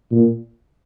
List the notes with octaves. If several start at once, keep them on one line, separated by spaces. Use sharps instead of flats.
A#2